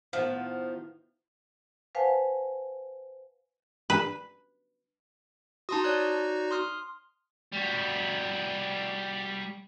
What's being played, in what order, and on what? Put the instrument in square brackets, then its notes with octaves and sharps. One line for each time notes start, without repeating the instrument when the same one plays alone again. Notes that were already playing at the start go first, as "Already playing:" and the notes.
[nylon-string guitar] A2 D#3 B3 [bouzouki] F3 [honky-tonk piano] F5 F#5
[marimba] B4 C5 F5 F#5 G#5 A5
[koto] B4
[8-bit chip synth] D#4 F#4 [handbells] A5 C6 D#6
[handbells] C#5 D5 F#6
C6 D#6 F6
[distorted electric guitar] G3 F#4